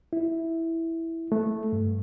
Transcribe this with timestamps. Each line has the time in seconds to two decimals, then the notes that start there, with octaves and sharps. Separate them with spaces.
0.13 E4
1.32 A3
1.73 G2